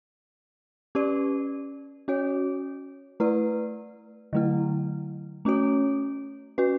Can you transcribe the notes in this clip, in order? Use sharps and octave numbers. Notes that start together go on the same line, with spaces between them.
C#4 G4 B4 D5
C#4 F#4 C#5
A3 E4 B4 D5
D3 F#3 A3 E4
A3 C#4 F#4 C#5
C#4 F#4 B4